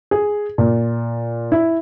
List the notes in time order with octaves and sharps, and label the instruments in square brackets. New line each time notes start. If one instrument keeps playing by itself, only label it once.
[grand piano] G#4
A#2
E4